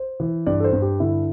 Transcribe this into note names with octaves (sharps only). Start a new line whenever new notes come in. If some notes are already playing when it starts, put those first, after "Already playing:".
Already playing: C5
E3
G2 D5
A4
C5
G2
G4
D3 E4